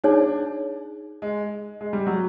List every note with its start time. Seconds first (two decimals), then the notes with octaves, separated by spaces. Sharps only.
0.04 D4 D#4 G#4 C#5
1.22 G#3
1.81 G#3
1.93 G3
2.07 F#3